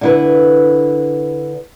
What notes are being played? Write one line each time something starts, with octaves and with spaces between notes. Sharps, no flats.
D3 E4 B4